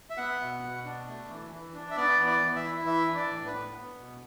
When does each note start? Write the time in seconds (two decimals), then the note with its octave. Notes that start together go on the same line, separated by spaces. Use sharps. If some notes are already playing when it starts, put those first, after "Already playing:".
0.10 E5
0.17 B3 F#5
0.41 B2
0.63 B2
0.85 D4
1.08 A3
1.30 E3
1.51 E3
1.74 D4
1.91 E5
1.97 B3 D5
2.20 E3
2.26 D5
2.41 E3
2.56 E5
2.64 E4
2.85 E3 E5
3.08 D4
3.16 D5
3.30 A2
3.46 B4
3.53 B3
3.75 B3
3.98 B2